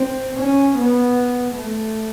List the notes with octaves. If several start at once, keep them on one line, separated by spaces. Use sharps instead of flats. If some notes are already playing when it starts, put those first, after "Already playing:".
Already playing: C4
C#4
B3
A3